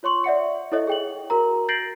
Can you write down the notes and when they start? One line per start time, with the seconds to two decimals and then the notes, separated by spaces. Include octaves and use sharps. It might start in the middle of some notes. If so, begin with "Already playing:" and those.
0.03 F4 C#5 C6 C#6 F#7
0.24 D5 E5 F#5 C#7
0.72 E4 A4 C#5 D#5 E5
0.87 G#4 G5 F#7
1.30 F#4 A#4 A#5
1.69 G6 A6 A#6 C7 D7 F#7